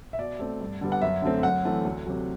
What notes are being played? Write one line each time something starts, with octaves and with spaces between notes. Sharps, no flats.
E5
B2 D5
A3 C4
G2
D3 G3 B3
F#5
F#2 E5
D3 A3 C4
F#2 F#5
E3 A3 C4
D2
C3 F#3